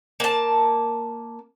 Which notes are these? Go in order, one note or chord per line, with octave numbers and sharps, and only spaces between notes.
A#3 A5